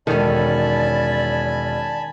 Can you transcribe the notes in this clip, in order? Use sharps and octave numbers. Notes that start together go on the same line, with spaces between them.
E1 D#3 C#4 A4 D5 G#5 A5 B5